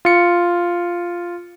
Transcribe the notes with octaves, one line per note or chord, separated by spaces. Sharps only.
F4 C#7